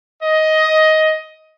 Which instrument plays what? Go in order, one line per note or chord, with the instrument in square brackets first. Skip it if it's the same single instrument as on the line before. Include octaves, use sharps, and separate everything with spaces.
[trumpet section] D#5